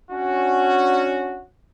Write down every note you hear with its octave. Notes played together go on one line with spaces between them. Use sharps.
C#4 D4 F#4